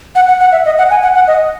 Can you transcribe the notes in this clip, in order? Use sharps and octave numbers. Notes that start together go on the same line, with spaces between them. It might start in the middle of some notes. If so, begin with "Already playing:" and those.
F#5
F#5
F#5
E5
D#5
F#5
G#5
F#5
F#5
D#5